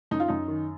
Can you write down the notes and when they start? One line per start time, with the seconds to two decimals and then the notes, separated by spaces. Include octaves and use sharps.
0.11 F#2 D#4
0.20 F4
0.28 F#2 D#4
0.48 D#3